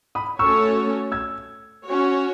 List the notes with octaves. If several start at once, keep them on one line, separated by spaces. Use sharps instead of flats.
B5 D#6
A3 C#4 F#4 A4 C#5 C#6 E6
E6 G#6
C#4 F#4 C#5